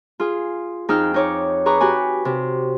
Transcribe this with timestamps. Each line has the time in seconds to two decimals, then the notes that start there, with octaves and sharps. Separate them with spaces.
0.20 F4 G#4
0.89 F2 D#4 G#4 G5 E6 F6
1.14 D#4 C#5 D6
1.66 G#4 B4 A#5 C#6 D6
1.81 F#4 G4 B4 G#5
2.25 C3